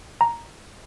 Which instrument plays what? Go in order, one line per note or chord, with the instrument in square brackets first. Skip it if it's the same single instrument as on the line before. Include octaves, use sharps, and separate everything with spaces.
[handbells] A#5